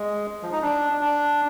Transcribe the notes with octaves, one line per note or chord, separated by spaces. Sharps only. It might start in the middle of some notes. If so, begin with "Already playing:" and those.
Already playing: G#3
F3
D#4
D4
D4